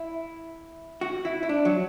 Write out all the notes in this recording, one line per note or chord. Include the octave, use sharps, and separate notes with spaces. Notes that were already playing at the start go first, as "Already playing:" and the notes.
Already playing: E4
F#4
E4
E4
D4
F#3